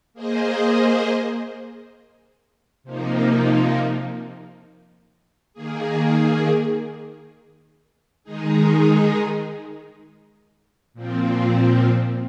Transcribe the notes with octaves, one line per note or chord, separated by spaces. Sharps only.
A#3 G#4 C5 D#5
C3 F3 A#3 D#4
D#3 A#3 G#4
D#3 G#3 D#4 G#4
A#2 F3 C4